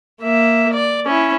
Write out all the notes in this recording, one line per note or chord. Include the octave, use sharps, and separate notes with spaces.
A#3 E5
D5
C#4 E4